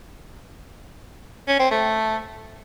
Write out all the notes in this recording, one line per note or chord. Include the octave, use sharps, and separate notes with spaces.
C#4
C4
A3